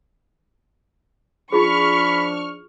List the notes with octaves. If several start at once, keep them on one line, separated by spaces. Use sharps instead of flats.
F3 D4 D#4 F4 G#4 B5 C#6 F6